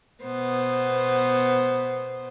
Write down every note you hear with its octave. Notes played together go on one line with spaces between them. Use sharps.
B2 B3 C5